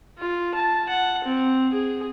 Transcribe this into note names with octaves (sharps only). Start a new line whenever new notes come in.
F4
A5
F#5
C4
G#4